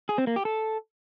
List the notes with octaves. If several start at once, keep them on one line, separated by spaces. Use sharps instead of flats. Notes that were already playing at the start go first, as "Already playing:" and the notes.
G#4
C4
A#3
G4
A4